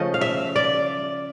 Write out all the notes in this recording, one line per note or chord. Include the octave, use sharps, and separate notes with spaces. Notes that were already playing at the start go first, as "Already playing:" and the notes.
Already playing: C#3 F3 A3 D#5
F5
E5
D5